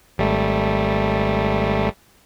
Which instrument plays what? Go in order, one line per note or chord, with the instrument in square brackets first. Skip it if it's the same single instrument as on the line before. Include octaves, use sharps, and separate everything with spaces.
[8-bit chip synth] G#1 G3 A3